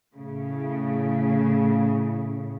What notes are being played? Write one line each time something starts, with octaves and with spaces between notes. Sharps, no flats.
A2 C#3